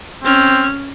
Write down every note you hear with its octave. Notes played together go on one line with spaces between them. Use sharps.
C4 C#4 F6